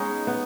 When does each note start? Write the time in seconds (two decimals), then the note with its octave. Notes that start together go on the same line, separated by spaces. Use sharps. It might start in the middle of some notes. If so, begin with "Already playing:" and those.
Already playing: G#3 B3 C#4 D#4
0.27 B3